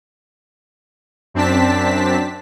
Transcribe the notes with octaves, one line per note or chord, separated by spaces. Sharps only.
F#2 C4 D4 A5 B6